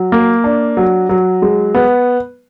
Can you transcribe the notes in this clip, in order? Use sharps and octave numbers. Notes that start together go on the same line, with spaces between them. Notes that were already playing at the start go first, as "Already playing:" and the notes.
Already playing: F#3
A#3
D4
F#3
F#3
G#3
B3